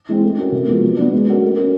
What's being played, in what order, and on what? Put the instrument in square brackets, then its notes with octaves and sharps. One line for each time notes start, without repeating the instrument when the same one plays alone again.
[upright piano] E3 G#3 C4
A3
C#4 F#4 A#4
C3
F3 G#3 B3
F#3
B3 D4
G#3
C#4 F#4 A#4
A3
C#4 F#4 A#4